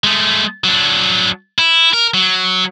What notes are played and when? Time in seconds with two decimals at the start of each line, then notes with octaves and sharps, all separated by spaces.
0.04 G#3 A3
0.64 F#3 D4
1.58 E4
1.93 A#4
2.14 F#3